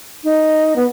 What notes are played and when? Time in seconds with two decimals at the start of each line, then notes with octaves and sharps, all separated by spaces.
0.24 D#4
0.76 B3